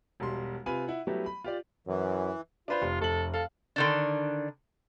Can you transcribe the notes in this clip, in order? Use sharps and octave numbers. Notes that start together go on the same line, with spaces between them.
E1 B1 G3 C6
C3 F4 B4 G#5 B5 D#7
E4 F#5
F#3 G3 A3 B3 E4 G4
B5
F4 G4 D5
F#2 E3
D4 F4 B4 C5
F1
F1 A4 F#7
A4 F5
D3 D#3 D4